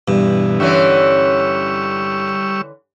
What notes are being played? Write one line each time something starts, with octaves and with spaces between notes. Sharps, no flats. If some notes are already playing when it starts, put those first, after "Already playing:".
G2 B2 E3
D3 E3 G3 C#4 C#6 E6